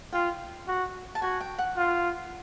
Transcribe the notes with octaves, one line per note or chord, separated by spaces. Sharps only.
F4 G5
F#4
A5
F#4 G#5
G5
F#5
F4